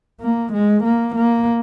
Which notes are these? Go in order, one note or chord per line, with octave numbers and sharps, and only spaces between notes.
A#3
G#3
A#3
A#3